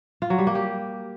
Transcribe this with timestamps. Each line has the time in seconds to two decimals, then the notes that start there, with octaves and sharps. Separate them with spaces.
0.22 F4
0.30 F#3
0.38 G3
0.47 A#3
0.55 G4